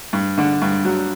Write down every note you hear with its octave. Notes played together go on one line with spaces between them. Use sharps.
G2
D3
G2
F#3